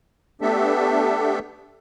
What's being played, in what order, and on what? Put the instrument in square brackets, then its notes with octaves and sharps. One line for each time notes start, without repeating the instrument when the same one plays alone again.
[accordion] A3 B3 D4 G4 A4 E5